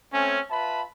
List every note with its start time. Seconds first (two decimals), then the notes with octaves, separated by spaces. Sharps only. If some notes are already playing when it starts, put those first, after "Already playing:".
0.13 A3 C4 C#4
0.49 F4 B4 E5 A5 B5